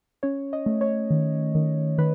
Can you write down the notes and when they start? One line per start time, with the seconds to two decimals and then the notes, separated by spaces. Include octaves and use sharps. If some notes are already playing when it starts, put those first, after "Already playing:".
0.23 C#4 C#5
0.53 D#5
0.66 A3
0.81 C#5
1.10 D#3
1.55 D#3
1.98 D#3 B4